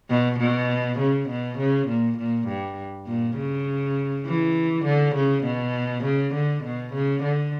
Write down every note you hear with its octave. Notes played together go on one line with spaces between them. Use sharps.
B2
B2
C#3
B2
C#3
A#2
A#2
G2
A#2
C#3
E3
D3
C#3
B2
C#3
D3
B2
C#3
D3